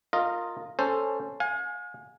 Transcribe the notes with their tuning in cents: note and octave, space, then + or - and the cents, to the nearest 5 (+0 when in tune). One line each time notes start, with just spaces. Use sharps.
F4 +5 A#4 -15 D#5 +0
C#4 +0 A4 +10 C5 +0
F5 +45 G#5 +0